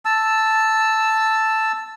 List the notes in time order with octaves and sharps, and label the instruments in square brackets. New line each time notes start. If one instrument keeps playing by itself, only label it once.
[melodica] A5 E6